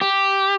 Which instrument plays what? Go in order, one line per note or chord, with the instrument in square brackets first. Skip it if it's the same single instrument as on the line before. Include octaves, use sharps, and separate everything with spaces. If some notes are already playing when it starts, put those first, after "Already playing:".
[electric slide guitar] G4